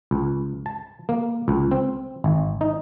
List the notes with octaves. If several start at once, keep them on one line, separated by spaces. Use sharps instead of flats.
C#2
A5
A#3
C#2
C4
G#1
D#4